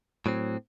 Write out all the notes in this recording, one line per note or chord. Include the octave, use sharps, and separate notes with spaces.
A2 F#3 C4